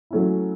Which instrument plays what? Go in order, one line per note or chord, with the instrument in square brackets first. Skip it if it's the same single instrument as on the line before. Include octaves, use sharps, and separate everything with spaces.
[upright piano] F#3 A3 C#4 E4